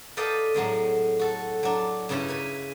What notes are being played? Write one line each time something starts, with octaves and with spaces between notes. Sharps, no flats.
A4 B4 D5 D#5 F5 G5
A2 F#3 G#3 C4
F#4 A4
F#3 D4
G2 C#3 G3 C#4 E4
B4 C#5 G#5